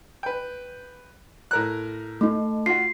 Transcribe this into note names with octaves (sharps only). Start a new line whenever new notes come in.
B4 G5
A2 A#4 F#6
A3 D#4
F4 F#4 C7